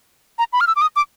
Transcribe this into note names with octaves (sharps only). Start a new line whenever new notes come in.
A#5
B5
F6
E6
D6
D#6
D6